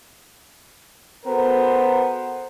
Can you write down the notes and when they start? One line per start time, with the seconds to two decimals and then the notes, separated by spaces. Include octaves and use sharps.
1.26 B3 F#4 A4 A#4 C5